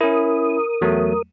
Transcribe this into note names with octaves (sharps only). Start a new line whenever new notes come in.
C#4 E4 A#4 D#6
E2 F#3 A3